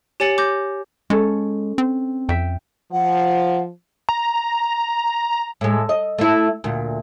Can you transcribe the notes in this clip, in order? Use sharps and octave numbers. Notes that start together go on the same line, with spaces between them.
G4 C#5 G#5 A6 C#7 F#7
D6 G6 A#6
G#3 C#4 A4
C4
F2 E5 G5
F3 F#5
A#5
A2 G#3
D#5
A3 E4
D2 A#2